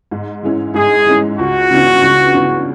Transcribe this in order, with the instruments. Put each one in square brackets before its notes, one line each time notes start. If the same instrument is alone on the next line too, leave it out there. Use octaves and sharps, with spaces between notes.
[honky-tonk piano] G#2
E3 G#3 C#4 E4
[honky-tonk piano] G#2 [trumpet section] G#4
[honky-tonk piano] E3 G#3 C#4 E4
[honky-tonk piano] C#2 [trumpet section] F#4
[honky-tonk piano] C#3 E3 B3 D4
C#2
C#3 E3 B3 D4